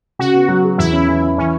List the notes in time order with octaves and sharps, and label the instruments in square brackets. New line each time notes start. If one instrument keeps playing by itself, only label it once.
[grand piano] C#3 [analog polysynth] F#4
[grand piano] B3
F#3
G#4
[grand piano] E2 [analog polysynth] E4
[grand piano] C#4
E3
E4
[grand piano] E3 [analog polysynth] C#4